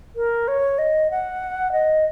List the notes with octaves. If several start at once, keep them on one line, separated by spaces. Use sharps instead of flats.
A#4
C#5
D#5
F#5
D#5